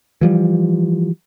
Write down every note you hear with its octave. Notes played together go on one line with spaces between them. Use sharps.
E3 F3 G3